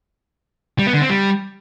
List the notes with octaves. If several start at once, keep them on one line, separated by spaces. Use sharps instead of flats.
G3
B3
D3
C4
G3